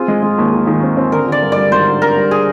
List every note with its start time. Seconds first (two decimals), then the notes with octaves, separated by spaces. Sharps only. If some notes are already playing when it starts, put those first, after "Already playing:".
Already playing: C4 F4 G#4
0.08 G#3
0.23 G#3
0.38 D#2
0.53 D#3
0.67 D#3
0.83 C4
0.97 C4
1.12 D3 A#4
1.27 D3
1.32 D5
1.43 G2
1.52 G3 D5
1.71 G#1 C5
1.87 D3
2.02 G2 A#4
2.17 G3
2.31 G#4